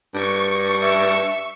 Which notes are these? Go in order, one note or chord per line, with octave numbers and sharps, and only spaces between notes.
G2 C#6
E5